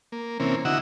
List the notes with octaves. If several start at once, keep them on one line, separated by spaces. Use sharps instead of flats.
A#3
C3 E3 A#3 C4 C#4
D3 E4 F#4 D#5 F#5 E6